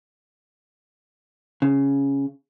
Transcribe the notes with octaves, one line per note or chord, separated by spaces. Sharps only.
C#3